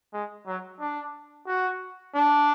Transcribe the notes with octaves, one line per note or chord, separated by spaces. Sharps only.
G#3
F#3
D4
F#4
D4